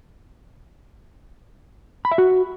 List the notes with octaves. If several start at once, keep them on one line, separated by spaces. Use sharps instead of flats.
B5
E5
F#4